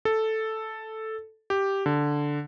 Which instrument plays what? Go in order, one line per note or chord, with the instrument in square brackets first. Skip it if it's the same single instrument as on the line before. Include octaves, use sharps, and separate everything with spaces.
[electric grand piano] A4
G4
D3